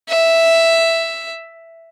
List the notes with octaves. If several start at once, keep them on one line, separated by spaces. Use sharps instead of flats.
E5